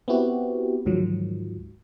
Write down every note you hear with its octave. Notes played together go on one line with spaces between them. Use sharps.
B3 C4 E4 F#4 G4
D2 G#2 D#3 F3 F#3